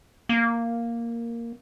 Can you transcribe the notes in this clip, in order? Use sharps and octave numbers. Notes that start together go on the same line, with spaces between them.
A#3